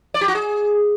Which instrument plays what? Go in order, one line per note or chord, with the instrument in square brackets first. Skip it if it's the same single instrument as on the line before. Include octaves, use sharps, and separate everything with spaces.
[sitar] D5
G4
F#4
G#4